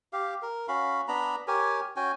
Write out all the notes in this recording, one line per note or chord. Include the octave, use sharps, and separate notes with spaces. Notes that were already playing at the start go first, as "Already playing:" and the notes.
G4 F5
A#4
C#4 F#4 F5 B5
B3 D4 A#5 B5
G4 A#4 C#5 G#5
C#4 F#4 G5 G#5